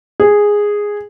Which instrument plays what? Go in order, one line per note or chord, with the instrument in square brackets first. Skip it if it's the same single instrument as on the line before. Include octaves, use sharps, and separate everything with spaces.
[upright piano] G#4